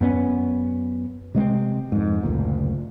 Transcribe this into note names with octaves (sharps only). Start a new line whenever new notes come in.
F#2 B3 C#4
C3 G#3 A#3 C4
F2 G#2
F#1 D2 A#2